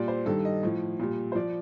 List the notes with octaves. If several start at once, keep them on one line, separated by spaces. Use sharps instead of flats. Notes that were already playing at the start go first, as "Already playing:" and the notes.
Already playing: A#2 G3 D5
C5
G2 D#3 G3 A4
D#5
A2 F3
A#2 G3
C5
F3 D5